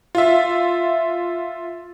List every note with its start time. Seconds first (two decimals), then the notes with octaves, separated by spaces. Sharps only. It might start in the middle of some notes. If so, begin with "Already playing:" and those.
0.15 F4 E5